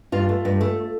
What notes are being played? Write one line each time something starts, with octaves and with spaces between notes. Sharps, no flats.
G2 F4
A3
G2
A3